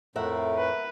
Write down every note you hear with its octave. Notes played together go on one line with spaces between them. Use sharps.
F2 A2 A3 A#4 E5 F#5
B4